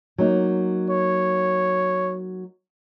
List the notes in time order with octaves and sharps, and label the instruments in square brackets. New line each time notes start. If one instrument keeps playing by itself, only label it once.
[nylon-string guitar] F#3 A#3 D#4
[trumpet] C#5